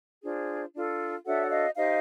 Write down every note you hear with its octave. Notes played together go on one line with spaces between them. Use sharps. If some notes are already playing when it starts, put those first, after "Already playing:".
D4 F4 G#4 C5
D4 F4 A4
D4 F#4 A4 C#5 E5 F#5
F#5
D#5 F5
D#4 G4 C5 D#5 F5